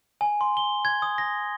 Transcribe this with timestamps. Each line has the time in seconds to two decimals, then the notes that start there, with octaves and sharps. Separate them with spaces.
0.21 G#5
0.41 C6
0.57 G7
0.85 G#6
1.02 D#6
1.18 A#6